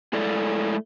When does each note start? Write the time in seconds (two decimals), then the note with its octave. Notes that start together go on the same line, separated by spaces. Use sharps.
0.13 G#3 A3 E4 A4 D5